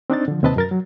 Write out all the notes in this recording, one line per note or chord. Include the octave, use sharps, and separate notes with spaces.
C4 D4 D#4 A6
D3 F3
D#2 C3 C4 B4 D#5 A5
F#2 A#4 A6
F#3